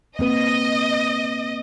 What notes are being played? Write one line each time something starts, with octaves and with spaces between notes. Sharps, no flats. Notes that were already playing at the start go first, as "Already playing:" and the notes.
A#3 C4 B4 D#5